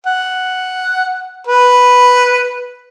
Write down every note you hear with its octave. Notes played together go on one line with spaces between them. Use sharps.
F#5
B4